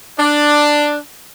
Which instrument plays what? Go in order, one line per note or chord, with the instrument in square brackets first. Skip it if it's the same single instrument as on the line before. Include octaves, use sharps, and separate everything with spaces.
[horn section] D4